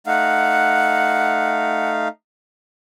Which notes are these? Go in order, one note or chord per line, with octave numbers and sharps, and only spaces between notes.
A3 D#4 F5 F#5